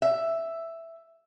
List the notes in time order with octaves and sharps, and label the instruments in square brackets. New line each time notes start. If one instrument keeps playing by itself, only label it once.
[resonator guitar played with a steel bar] E5